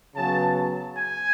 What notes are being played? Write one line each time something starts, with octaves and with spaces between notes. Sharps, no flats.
C#3 F#3 B3 A5
G#5